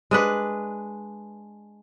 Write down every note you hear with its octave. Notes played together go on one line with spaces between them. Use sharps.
G#3 D4 B4